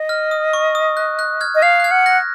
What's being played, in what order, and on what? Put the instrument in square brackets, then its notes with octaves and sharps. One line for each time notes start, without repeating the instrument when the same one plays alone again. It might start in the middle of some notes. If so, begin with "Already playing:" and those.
Already playing: [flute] D#5
[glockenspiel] F6
D#6
C#6
D#6
F#6
F#6
F6 G#6
[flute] D#5
[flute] F5 [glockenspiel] F6 G#6
[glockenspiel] F#6
F6 G#6
[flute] F#5
[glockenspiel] F#6 A#6